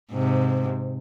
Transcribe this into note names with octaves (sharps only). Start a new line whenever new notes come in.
G#2 C3